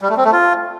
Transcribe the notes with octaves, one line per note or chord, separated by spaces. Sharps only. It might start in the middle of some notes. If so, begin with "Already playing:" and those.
G3
A3
C4
A3
F4